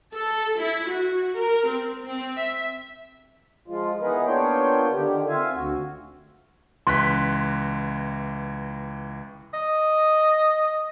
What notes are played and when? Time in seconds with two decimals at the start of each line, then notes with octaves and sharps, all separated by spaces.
0.13 A4
0.58 E4
0.89 F#4
1.36 A#4
1.66 C4
2.05 C4
2.36 E5
3.68 F3 G#3 F4
4.00 E3 B3 D#4 G#4 A#4 B4
4.26 A#3 B3 D4 F4 C#5 G5
4.91 D3 D#3 G4
5.28 C4 F4 E5 F5 G#5
5.53 D2 F#4
6.87 C#2 E3 C6 F#6 B6
9.54 D#5